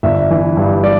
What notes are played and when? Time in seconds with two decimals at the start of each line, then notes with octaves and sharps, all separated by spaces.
0.03 G1 E5
0.30 E3
0.57 G2
0.83 G3 D5